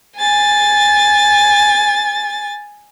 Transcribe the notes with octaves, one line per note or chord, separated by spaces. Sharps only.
G#5 A6